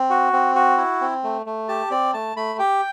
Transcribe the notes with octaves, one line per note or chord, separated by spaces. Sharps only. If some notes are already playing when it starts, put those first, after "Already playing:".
Already playing: C4
F#4
C4
F#4
E4
C4
A3
A3
G4 A5
C4 D5
A3 A5
A3 B5
G4 G5